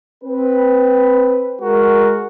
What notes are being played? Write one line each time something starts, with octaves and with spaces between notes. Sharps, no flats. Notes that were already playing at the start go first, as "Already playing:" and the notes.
C4 B4
G#3 F#4 A#4